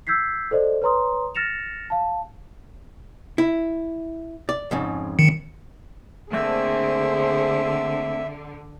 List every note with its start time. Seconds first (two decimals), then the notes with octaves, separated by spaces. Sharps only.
0.07 E6 G6 G#6 B6 C7
0.51 A4 C5 D5 D#5
0.82 B4 C#5 A#5 C6 D#6
1.35 F6 A6 A#6 C#7 E7 F7
1.90 F5 A5
3.38 E4
4.49 D5
4.71 F2 G#2 C#3
5.19 D#3 C#7
6.33 D3 A3 A#3 C4 G#4 C5 E5